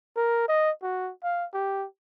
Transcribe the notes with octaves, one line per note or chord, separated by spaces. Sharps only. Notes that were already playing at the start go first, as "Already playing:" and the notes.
A#4
D#5
F#4
F5
G4